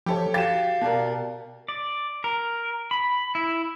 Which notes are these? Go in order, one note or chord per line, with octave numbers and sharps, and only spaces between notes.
F3 G4 A4 C#5
F#4 G4 F5 A6 E7
B2 F#4 A#4 D5 A5
D5
A#4
B5
E4